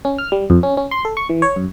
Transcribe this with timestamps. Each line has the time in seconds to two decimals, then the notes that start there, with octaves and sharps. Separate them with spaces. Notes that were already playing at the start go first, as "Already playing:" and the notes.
0.05 C#4
0.18 F6
0.32 G3
0.50 F2
0.63 C#4
0.77 C#4
0.91 C6
1.05 A4
1.17 C#6
1.29 E3
1.42 C#5
1.56 F#2